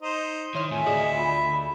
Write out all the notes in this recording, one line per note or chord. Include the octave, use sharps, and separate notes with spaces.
D#4 C5
D#3 E4 C#5 C6 F6
F2 A2 E5 G#5
D2 D4 F#4 G#4 D#5
F4 B5